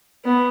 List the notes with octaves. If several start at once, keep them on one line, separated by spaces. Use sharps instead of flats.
B3